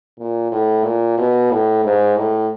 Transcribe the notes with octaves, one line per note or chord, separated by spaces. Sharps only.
A#2
A2
A#2
B2
A2
G#2
A2